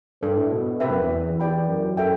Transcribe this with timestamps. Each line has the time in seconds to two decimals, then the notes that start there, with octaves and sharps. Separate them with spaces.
0.21 G2 D4 A4 C5
0.37 A2
0.51 B2
0.80 C3 B4 E5 G5
0.90 F#2
1.00 E2
1.40 E4 G4 D5 G5 B5
1.68 F#2
1.97 A4 E5 G5